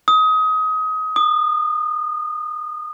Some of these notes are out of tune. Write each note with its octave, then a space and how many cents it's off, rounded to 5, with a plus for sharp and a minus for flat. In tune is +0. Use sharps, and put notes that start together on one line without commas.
D#6 +25
D#6 -30